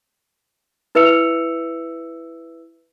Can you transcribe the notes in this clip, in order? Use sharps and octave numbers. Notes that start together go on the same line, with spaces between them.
E4 B4 E5 E6 C#7 F7